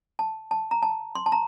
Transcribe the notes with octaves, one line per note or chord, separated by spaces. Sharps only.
A5
A5
A#5
A5
C6
A5
A#5